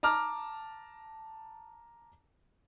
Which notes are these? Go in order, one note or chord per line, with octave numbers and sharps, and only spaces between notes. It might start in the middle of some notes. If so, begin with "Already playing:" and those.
A5 A#5 D6 F6